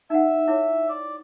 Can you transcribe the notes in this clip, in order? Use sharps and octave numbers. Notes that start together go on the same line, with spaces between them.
D#4 E5 F#5
E4 C#5 D6
D5